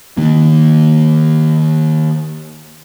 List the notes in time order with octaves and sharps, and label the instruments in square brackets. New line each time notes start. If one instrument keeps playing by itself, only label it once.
[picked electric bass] D#3 A#3